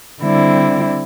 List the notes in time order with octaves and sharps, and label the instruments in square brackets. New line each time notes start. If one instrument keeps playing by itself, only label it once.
[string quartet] D3 G3 C4 E4